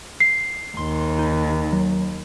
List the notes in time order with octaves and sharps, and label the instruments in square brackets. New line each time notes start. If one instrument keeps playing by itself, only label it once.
[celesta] C7
[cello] D#2 [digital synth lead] C6
[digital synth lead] D#4
F#3